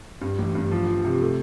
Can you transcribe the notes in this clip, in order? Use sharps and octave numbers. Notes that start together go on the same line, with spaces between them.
G2
A1
G2
F3
F3
C3
A3